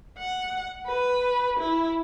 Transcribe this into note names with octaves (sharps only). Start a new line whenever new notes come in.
F#5
B4
E4